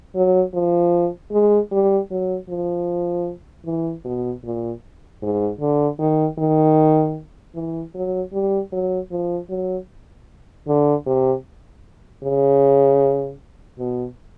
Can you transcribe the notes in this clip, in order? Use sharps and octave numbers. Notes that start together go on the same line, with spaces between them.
F#3
F3
G#3
G3
F#3
F3
E3
B2
A#2
G#2
D3
D#3
D#3
E3
F#3
G3
F#3
F3
F#3
D3
C3
C#3
B2